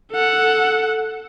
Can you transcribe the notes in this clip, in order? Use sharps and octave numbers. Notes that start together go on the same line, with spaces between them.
A4 F#5